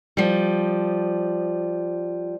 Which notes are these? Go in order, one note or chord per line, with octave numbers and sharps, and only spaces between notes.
F3 G3